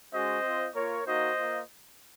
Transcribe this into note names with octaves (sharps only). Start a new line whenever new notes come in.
G#3 C#4 F#4 C5 D#5
C4 F4
A#3 F4 A#4 C#5
A#3 D#4 F#4 C5 D#5
A#3 F4